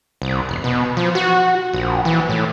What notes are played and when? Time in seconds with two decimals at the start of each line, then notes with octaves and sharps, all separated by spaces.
0.22 C2
0.49 E1
0.64 B2
0.97 F3
1.15 F#4
1.73 A#1
2.05 E3
2.29 A2